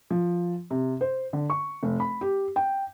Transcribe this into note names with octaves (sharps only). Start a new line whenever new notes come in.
F3
C3
C5
D3
C#6
F1
B5
G4
G5